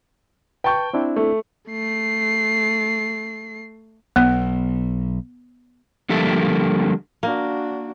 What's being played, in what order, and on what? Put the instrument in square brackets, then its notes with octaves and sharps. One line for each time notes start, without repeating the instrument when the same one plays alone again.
[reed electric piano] B4 A5 G6 [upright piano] G5 C#6
[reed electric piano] C4 D4 E4
[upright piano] A3
[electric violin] A3 C7
[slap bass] B1 [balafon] B3
[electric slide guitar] D3 F3 G3 A#3 A4 E5
[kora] A#3 [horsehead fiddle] D4 F#4